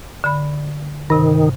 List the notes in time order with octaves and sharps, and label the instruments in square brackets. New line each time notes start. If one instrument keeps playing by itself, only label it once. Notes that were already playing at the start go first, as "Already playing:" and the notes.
[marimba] D3 B5
[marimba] G2 C3 [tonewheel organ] D#3